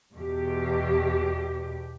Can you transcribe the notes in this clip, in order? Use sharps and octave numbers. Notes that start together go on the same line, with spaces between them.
E2 B2 G4